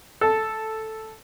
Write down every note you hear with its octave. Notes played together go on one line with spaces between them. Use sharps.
A4